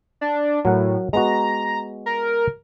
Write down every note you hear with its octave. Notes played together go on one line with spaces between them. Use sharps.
D4
A2 F#3 A#4 F#5
G#3 B3 F#4 A#5
A#4